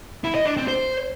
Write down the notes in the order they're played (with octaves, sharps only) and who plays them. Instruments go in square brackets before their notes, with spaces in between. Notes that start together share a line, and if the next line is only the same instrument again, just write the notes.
[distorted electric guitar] E4
D#5
D4
C4
C5